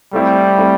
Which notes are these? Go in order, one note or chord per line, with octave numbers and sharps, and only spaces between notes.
G3 A3 C4 E4
A3 C4 E4